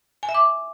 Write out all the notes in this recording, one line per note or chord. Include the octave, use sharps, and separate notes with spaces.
G#5
E5
D6